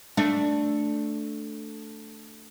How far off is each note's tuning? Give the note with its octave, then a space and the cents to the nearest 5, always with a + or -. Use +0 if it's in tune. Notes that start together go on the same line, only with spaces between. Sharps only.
A3 +0 D4 +0